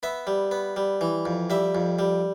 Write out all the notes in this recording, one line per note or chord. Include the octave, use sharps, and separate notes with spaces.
B3 E5
G3
B3
G3
E3
F2
G3 E5
F2
G3